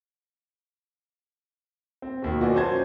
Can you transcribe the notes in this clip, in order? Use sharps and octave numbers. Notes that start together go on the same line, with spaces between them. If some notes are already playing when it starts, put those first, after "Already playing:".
C4
D#2 B2
F4 F#4 B4 D5 D#5 G#5
F#3 C#4 C5 A5 G#6